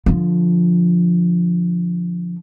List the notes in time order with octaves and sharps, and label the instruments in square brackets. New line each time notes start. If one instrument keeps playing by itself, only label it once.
[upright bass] D3 F3